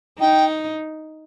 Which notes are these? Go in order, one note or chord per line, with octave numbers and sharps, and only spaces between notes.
D#4 G5